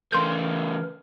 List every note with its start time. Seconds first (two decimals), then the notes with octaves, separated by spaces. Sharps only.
0.12 C#3 E3 A3 A#4 C6 G6